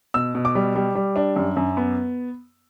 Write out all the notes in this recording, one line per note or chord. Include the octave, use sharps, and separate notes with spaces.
B2 E6
B2
D6
G3
G3
G3
D4
F#2
F#2
B3